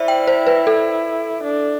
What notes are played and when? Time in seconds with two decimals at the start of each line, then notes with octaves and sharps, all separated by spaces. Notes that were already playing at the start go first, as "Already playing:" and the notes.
Already playing: E4 C5 D5 E5
0.08 G5
0.27 C5
0.47 B4
0.67 A4
1.44 D4